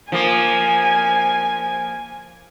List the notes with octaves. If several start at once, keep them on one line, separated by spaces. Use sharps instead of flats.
F3 A#3 G#5